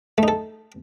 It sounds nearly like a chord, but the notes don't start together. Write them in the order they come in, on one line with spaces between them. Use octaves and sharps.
A3 D#4 A4